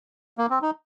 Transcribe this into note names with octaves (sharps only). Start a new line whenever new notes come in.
A#3
C4
D#4